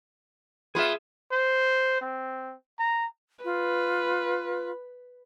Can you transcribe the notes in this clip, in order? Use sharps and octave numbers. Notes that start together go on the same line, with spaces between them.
B3 F4 G#4 E5
C5
C4
A#5
F4 B4